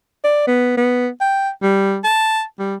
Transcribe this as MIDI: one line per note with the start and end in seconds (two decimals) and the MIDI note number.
0.24 0.46 74
0.47 0.72 59
0.77 1.08 59
1.21 1.49 79
1.62 1.98 55
2.04 2.42 81
2.59 2.75 55